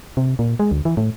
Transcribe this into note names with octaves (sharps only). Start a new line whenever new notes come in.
C3
A#2
G#3
D2
E3
A2